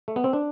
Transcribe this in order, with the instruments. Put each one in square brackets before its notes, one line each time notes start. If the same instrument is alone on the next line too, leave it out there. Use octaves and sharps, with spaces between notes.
[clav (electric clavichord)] A3
B3
C4
D4